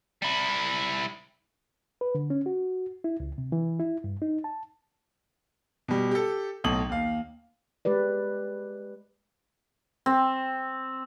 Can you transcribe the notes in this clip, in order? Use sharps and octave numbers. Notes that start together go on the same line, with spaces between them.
G3 E4
B4
D3
C#4
F#4
E4
C#2
C3
E3
E4
G2
D#4
A5
B2 G3
G4 A4
B1 A2 D#6 F#7
D#2 F5
G#3 G4 B4 D5
C4